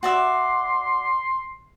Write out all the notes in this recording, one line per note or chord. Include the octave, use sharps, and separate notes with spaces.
F#4 D5 E5 C6